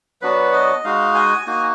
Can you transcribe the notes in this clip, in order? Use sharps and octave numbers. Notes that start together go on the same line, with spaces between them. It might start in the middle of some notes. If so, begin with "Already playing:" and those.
F#3 B3 D4 F#4 B4
D#5
G#3 D#4 F#4 F5
G#5
A#3 D#4 F#4 G#5